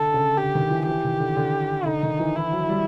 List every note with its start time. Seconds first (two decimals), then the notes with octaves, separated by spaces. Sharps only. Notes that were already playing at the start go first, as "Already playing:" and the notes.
Already playing: D3 A4
0.14 C#3
0.38 D3 G4
0.55 D#3
0.70 E3
0.87 E3 G4
1.04 D#3
1.20 D3
1.37 D3
1.86 D3 D#4
2.03 D#3
2.19 E3
2.36 E3 E4
2.52 F#3
2.69 G3